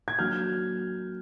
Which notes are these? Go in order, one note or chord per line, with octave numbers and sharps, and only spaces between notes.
G#6
F#3 A#3 D4 F6 G6